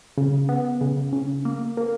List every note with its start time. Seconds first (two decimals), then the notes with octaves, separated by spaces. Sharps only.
0.18 C#3
0.49 B3
0.81 C#3
1.13 C#3
1.45 A#3
1.77 A#3